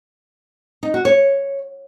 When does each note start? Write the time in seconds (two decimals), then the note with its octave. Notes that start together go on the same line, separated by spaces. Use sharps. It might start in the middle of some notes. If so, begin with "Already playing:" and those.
0.83 D#4
0.94 F#4
1.05 C#5